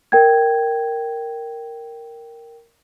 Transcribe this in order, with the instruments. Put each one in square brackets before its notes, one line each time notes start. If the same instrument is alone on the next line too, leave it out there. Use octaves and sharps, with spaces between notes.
[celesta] A#4 G5 G#6